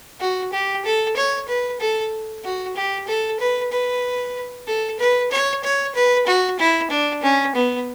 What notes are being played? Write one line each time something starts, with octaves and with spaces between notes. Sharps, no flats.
F#4
G4
A4
C#5
B4
A4
F#4
G4
A4
B4
B4
A4
B4
C#5
C#5
B4
F#4
E4
D4
C#4
B3